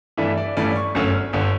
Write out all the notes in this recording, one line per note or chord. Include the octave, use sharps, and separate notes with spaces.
G2 E3 A3 D4 E5
D5
A1 G2 E3 A3 C#4 D5
C#6
G1 F#2 D3 A3 C#4
G1 D3